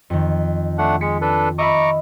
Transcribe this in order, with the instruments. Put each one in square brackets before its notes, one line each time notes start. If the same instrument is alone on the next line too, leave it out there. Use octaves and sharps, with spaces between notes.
[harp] F2 D#3
[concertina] A3 D4 F#5
[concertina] G#3 [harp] B6 C#7
[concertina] D4 A4 B4
[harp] D#5 E5 B5 [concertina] A#5 C#6 D6